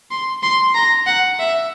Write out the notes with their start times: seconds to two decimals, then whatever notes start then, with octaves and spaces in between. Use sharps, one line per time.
0.11 C6
0.43 C6
0.75 A#5
1.06 F#5
1.39 E5